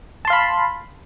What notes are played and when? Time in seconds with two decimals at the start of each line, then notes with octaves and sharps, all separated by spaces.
0.25 A5
0.27 C6
0.30 F5
0.33 B5